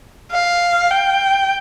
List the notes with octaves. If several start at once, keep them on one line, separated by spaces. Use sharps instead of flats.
F5
G5